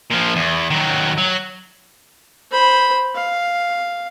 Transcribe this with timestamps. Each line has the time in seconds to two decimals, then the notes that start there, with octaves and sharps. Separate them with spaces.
0.11 A#2 F3
0.36 E2
0.70 D#3 F#3
1.18 F#3
2.51 C5 B5
3.16 F5